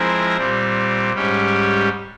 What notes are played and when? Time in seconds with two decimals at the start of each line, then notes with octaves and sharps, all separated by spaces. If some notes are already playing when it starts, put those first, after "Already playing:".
Already playing: F3 G#3 C4 E4 A#4
0.37 A#2 G3 C4
1.13 G#2 G3 C#4 G4